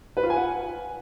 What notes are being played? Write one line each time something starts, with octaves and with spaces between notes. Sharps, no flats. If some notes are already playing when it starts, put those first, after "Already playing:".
B4
F4
G#5
F#5